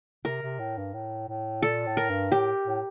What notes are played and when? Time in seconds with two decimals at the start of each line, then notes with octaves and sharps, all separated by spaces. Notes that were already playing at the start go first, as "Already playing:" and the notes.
0.25 C3 A#4
0.42 C3
0.59 A2
0.77 G2
0.94 A2
1.28 A2
1.62 A#2 A4
1.87 A2
1.97 A#4
2.10 G2
2.32 A2 G4
2.67 A2